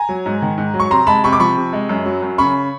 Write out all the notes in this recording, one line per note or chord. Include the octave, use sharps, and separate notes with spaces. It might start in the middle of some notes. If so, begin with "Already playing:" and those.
Already playing: G#5 A#5
F#3
G#2
D#3
G#2
F#3
C#6
C3 A#5 C6
G#3 A5 B5
C3 B5 C#6
D6
F3 B5 C#6
C3
G#3
F#2
F#3
F#2
C#3 B5 C#6